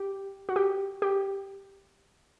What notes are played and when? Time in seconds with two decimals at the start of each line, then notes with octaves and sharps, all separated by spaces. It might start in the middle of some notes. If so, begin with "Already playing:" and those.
Already playing: G4
0.49 F#4
0.56 G4
1.02 G4